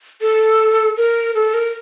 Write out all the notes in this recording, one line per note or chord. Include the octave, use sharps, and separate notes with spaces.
A4
A#4
A4
A#4